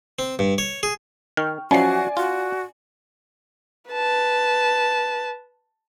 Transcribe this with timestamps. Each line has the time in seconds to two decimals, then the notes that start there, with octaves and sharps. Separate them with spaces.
0.19 C4
0.39 G2
0.58 C#5
0.83 G#4
1.37 D#3 G5 C#6 F6
1.71 F3 F#3 C#4 F#4 D5 E5 G#5 C7
2.17 F4 F#4
3.91 B4 A5